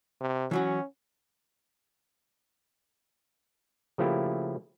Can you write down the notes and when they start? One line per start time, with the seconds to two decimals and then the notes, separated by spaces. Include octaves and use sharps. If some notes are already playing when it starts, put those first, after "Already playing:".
0.20 C3
0.51 E3 F#3 C#4 F#4
3.98 C#3 F3 A3 A#3 E4 G4